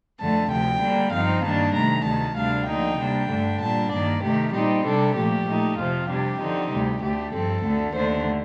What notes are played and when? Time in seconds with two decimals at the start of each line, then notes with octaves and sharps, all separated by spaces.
0.20 F2 D3 A3 A5
0.51 D2 C3 F3 G5
0.81 D3 G3 A#3 D4
1.13 G2 F3 C4 D#4 F5
1.44 G2 D#3 G3 A#3 D4 A5
1.75 C3 D#3 A3 A#5
2.06 D2 C3 D#3 A5
2.37 D2 C3 G3 D4 F5
2.69 D3 F3 A#3 D#4 G5
2.99 C3 G3 A#3 D4
3.30 G2 D3 A3 D4
3.61 A#2 G3 D4 A5
3.92 G2 D#3 A#3 D5
4.23 C3 D#3 A3 G4
4.54 A#2 G3 C4 D#4 G4
4.85 C3 G3 D4 A4
5.16 A#2 F3 A3 G4
5.48 A#2 A3 D#4
5.78 F2 C3 F3 C4 F4
6.09 C3 G3 D4 G4
6.41 D3 F3 C4 D#4
6.71 D2 C3 G3 G4
7.02 D2 D3 A3 G4
7.33 G2 F3 C4 A4
7.64 D2 D3 A3
7.95 D#2 D3 A3 D4 C5